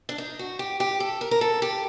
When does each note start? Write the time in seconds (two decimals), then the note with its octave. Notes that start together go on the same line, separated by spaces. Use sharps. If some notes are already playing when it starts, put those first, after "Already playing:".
0.09 D4
0.18 D#4
0.39 F#4
0.59 G4
0.80 G4
1.00 A4
1.21 A#4
1.31 A#4
1.41 A4
1.62 G4